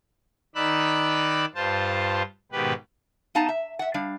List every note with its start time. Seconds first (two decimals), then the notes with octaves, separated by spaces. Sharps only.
0.55 D#3 D#4 D5 B5 E6 F#6
1.55 G2 F4 C5 A5
2.52 G#2 B2 D#3 G4 B4
3.35 B3 D#4 F5 A5 A#5
3.49 E5
3.79 E5 F#5
3.94 G3 D4 F5